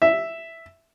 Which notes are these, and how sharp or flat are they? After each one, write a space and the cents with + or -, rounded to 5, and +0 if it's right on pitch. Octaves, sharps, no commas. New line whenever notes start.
E5 +0